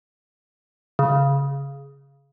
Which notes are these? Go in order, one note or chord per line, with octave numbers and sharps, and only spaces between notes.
C#3